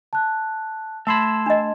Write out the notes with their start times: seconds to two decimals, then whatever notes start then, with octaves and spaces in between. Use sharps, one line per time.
0.13 A5 F#6
1.07 A3 A5 B5 C6 E6 G#6 C7 E7
1.46 D4 D#5